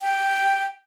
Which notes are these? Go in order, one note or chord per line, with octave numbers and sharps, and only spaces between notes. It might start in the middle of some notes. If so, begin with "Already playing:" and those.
G5